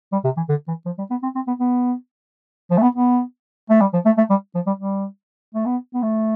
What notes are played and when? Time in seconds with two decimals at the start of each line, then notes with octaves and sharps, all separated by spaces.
0.12 G3
0.24 C3
0.37 E3
0.49 D3
0.68 E3
0.86 F3
0.98 G3
1.11 B3
1.23 C4
1.35 C4
1.48 B3
1.60 B3
2.71 F3
2.78 A3
2.82 B3
2.95 B3
3.70 A3
3.81 G3
3.93 F3
4.06 A3
4.18 A3
4.30 G3
4.55 F3
4.67 G3
4.79 G3
5.55 A3
5.66 B3
5.94 B3
6.03 A3